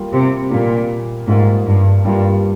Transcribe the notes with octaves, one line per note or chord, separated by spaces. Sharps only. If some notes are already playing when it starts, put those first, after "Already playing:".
Already playing: G3 A#3 F4
C3
A#2 G3 A#3 F4
G#2 G3 A#3 F4
G2
G2 G3 A#3 F4